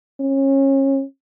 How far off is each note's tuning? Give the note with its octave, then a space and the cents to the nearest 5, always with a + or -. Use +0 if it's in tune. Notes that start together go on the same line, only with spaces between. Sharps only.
C#4 -30